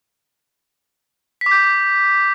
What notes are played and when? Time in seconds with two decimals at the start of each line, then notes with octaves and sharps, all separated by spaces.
1.41 B6
1.46 D6
1.51 G6